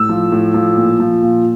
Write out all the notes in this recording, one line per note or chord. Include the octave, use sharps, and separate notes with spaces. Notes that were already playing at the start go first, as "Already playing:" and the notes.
Already playing: A2 E6
F3
A2
F3
A#2
F3
A#2